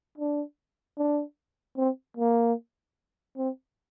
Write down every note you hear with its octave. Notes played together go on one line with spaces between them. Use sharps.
D4
D4
C4
A#3
C4